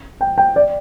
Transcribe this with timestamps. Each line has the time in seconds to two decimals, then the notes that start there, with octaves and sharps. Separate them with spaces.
0.21 G5
0.38 G5
0.56 D5